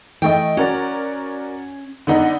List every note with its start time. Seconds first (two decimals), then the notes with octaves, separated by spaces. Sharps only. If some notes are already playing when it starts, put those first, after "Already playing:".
0.22 E3 A3 D#5 G5
0.57 C#4 F#4 A#4 D5
2.07 D3 B3 D#4